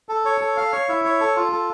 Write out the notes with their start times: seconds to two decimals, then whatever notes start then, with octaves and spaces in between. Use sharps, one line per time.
0.09 A4
0.25 C#5
0.41 A4
0.57 F5
0.72 C#5
0.88 E4
1.05 C#5
1.20 A4
1.36 F4
1.52 A4